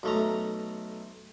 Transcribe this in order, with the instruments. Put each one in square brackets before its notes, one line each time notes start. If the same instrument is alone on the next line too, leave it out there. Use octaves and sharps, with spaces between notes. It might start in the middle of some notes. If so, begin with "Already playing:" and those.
[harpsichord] B1 A3 A#5